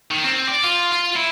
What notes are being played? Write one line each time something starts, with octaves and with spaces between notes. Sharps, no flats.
D#3
C4
D5
F4
F4
E4